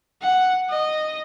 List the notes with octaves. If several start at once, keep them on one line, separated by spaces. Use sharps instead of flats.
F#5
D#5